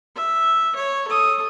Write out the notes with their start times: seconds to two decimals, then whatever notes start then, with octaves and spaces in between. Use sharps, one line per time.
0.16 E5
0.76 C#5
1.08 A4 D#6